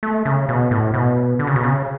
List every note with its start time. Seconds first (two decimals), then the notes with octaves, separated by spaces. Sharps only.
0.03 A3
0.25 C#3
0.49 B2
0.71 A2
0.94 B2
1.39 D3
1.47 C#3
1.56 B2
1.63 C#3